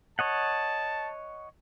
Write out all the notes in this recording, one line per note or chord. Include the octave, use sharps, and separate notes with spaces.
C#5 D#5 F#5 A5